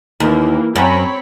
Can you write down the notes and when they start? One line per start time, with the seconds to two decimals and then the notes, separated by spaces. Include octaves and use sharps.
0.20 D#2 E3 A#3
0.76 F#2 C4 C#5 B5